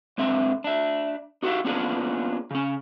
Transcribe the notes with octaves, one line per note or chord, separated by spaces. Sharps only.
G#2 D3 C4 E5
D4 E5
D#4 F#4 G4 A#4 E5 F5
A#3 B3 C#4 D4 F4 G#4
C#3 C#4